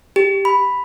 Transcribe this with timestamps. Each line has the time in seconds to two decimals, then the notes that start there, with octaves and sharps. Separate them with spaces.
0.16 G4
0.45 B5